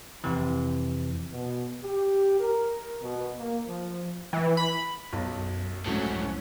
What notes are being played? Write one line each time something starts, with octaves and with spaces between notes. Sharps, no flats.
F2 C3 E3
B2
G4
A#4
B2
A#3
F3
E3
B5
B1 F#2
C2 F2 G#2 F#3 A3 C#4 E4 F#4